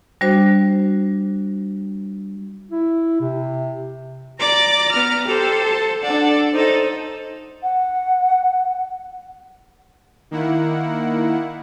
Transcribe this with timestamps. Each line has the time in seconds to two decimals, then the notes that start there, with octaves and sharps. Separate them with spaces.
0.21 G3 D4 F#4 C5
2.71 E4
3.20 C3
4.40 D5 A#5 D6
4.91 B3 F6
5.27 G4 A4 C5
5.63 A5
6.03 D4 A4 D5 F#5
6.54 D#4 A4 C5 D#5
7.63 F#5
10.31 D#3 A#3 E4 F#5